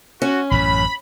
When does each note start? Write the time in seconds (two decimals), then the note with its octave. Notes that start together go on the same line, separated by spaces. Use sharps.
0.22 C#4 F#4
0.51 A1 F#2 A2 B5